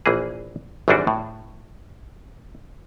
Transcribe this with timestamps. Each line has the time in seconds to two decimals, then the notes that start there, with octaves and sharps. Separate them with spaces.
0.06 A#1 E3 A#3 G#4
0.88 G#1 F#2 E3 G3 D4 F#4
1.07 A2